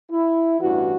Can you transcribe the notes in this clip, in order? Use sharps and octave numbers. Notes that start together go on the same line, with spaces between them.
E4
A1 G2 E3 F#4